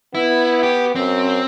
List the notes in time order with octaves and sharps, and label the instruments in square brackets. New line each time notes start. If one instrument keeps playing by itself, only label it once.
[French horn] B3 [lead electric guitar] E4
[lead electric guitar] G4
[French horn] F#2 [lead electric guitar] C4